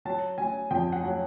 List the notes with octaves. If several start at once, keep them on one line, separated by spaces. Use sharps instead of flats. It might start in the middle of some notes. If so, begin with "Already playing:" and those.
F#3 A5
F#3 G#5
F2 G5
F#5
F#3